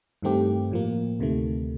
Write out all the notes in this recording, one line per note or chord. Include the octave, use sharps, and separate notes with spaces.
G2 D#3 A3 C4 G4
A2 F3 A#3
D2 C3 D#3 A3